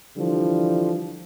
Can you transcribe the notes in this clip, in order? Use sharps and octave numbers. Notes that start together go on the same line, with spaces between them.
D3 E3 F3 G3